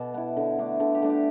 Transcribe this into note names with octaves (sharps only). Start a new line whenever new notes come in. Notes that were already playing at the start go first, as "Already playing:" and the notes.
Already playing: B2 A4 A5 D6
B3 E4
D3
A3 D4
D3 A4
G4
A3 D4
G4